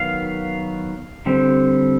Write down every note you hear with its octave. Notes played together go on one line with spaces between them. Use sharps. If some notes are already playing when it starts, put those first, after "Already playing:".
Already playing: D#3 F#3 B3 F5
D3 G3 C4